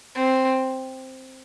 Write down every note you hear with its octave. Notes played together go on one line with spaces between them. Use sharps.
C4